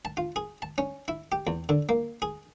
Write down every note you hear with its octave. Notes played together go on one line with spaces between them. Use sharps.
A5
F4
G#4
A5
C#4
E4
G4
E2
D3
A#3
G#4